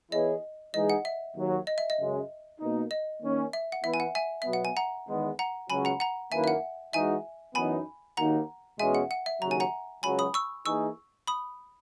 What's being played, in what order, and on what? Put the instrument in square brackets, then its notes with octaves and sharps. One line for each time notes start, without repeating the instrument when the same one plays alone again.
[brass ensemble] E3 B3 E4 G#4 C#5 [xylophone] D#5
[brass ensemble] E3 G#3 D#4 G#4 [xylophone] D#5
[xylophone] F#5
E5
[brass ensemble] D#2 D#3 F#3
[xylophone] D#5
E5
D#5
[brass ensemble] F#2 C#3 G#3
B2 A#3 D#4
[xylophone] D#5
[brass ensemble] D#3 A#3 C#4
[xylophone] E5
F#5
[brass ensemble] E3 B3 E4 B4 [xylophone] E5
[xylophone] G#5
F#5
E5 G#5
[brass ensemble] B2 F#3 B3 [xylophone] E5
[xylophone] F#5
G#5
F#5 A#5
[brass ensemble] E2 D#3 G#3 B3
[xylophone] F#5 A#5
[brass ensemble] C#2 C#3 F#3 C#4 F#4 [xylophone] G#5 B5
[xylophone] F#5 A#5
F#5 A#5
[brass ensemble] F#2 D#3 A#3 E4 B4 [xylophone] E5 G#5
[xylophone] E5
F#5
[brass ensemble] E3 G#3 D#4 F#4 [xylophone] E5 G#5
[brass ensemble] F#2 E3 B3 D#4 [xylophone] G#5 B5
[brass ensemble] D#2 D#3 A#3 D#4 F#4 [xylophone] F#5 A#5
[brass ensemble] E2 B2 G#3 C#4 G#4 [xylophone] E5 G#5
[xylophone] F#5
F#5
E5
[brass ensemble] D#2 C#3 F#3 [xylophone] A#5
[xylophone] G#5
F#5 A#5
[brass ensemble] C#2 C#3 F#3 [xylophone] G#5 B5
[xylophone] B5 D#6
C#6 E6
[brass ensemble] E3 A#3 D#4 G#4 [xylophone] C#6 E6
[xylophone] B5 D#6